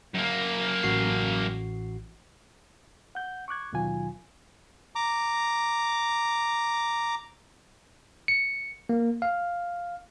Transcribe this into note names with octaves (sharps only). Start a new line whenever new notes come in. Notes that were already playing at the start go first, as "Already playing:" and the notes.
F#2 A#3
A1 F#4 C7
F#5 G6
C#6 D6 F#6 G#6
D#2 B2 D#3 F#3 F4 G#5
A#5 D6
C#7
A#3
F5